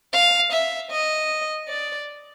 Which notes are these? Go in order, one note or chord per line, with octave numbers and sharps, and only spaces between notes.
F5
E5
D#5
D5